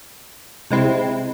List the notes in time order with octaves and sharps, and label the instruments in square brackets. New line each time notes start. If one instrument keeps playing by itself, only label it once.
[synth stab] C3 G#3 C4 E4